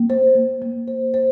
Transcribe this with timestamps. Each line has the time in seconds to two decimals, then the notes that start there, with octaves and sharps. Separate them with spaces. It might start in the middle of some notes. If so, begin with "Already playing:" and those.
Already playing: A#3
0.10 C5
0.35 A#3
0.62 A#3
0.88 C5
1.14 C5